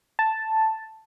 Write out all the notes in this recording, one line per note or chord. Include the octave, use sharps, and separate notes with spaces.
A5